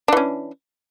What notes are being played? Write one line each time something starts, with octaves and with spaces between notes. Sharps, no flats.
E3 C#4 D4